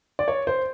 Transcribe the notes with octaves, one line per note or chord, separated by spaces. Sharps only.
D5
C#5
C5